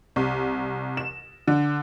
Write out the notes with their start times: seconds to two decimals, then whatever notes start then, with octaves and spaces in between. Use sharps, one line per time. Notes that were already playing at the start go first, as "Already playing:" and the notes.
0.16 C2
0.97 E7
1.48 D3